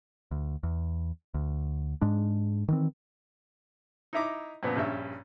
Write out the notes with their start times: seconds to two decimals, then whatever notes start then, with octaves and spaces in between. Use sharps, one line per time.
0.31 D2
0.63 E2
1.34 D2
2.01 G#2 G#3 D4
2.68 D#3 E3 C4
4.13 D#4 E4 E5 A#5 D6
4.63 F#2 A#2 F3 B3
4.76 A#1 G2 C#4 E5